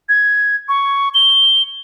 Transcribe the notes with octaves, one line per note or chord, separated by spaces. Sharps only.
G#6
C#6
G7